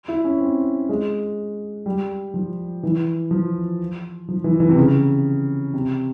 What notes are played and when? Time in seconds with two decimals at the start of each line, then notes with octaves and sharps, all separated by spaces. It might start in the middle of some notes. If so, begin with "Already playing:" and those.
0.08 E4
0.24 C#4
0.40 C4
0.89 G#3
1.86 G3
2.34 F3
2.83 E3
3.31 F3
4.28 F3
4.44 E3
4.60 E3
4.69 C3
4.77 C#3
5.74 C3